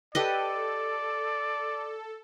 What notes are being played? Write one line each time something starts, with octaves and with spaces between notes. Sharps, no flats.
G4 A4 B4 D5 D#5